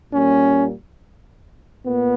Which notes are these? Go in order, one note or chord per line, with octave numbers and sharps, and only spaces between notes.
A#2 G3 A#3 C#4
A#2 B3